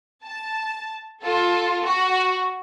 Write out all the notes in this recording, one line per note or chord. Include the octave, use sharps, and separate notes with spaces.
A5
F4 A4
F#4